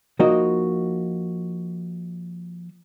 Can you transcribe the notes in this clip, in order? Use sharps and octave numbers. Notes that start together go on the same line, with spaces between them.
F3 A#3 D#4 F#4 D#5